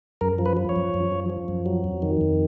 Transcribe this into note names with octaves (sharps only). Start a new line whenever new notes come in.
F#2 A#4
F3
B4
F3
C#5
F#2
F#2
F3
F3
F#2
F#3
F2
D#3
F2